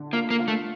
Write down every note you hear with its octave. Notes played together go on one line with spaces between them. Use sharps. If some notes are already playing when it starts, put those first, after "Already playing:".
Already playing: D3
A#3 F4
A#3
F4
A3